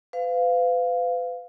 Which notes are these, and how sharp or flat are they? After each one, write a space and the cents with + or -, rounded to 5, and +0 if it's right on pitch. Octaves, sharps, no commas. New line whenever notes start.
B4 +40 F5 +0